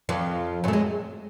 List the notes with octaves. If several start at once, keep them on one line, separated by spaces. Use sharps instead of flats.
F2 F3
F#2 F#3
A3
G#3